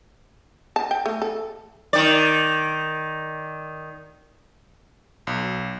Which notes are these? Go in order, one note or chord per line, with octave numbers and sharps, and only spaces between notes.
A5
G5
A3
A4
D#3 D5
B1